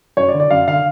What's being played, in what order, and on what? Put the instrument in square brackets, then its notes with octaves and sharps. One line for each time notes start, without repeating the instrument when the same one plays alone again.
[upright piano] F#2 C#5
D5
D3
D5
F#2 F5
D3 F5